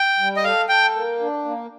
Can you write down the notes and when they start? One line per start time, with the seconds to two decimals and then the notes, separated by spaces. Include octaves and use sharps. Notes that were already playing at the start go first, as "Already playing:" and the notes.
Already playing: G5
0.19 G3
0.36 D#5
0.44 A4 F5
0.69 A4 G5
0.94 A#3
1.20 D4
1.45 A#3